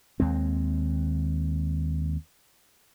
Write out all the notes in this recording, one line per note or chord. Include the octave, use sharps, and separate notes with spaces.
D#2 G#3 C4